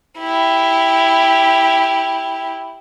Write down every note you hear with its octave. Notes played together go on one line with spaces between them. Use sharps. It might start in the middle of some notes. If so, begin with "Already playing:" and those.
E4 G4